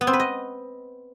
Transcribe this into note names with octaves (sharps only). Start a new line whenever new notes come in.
B3
C4
B4
D#5